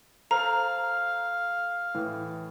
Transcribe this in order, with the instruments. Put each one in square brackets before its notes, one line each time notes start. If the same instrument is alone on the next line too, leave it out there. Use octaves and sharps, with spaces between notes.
[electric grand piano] A4 C5 [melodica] F5 [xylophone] A#5
[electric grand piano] A2 E3